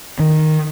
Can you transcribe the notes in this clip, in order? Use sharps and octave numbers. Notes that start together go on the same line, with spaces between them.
D#3